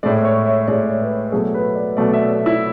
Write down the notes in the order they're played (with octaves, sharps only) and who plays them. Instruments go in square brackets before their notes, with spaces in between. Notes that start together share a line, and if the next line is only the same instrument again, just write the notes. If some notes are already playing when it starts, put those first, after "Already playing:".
[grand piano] A2 G#3 D5
C#5
E5
A2 G#3 D5
B4
B2 F#3 A3 G#4
B4
D5
B2 F#3 A3 D5
E5
D5
E4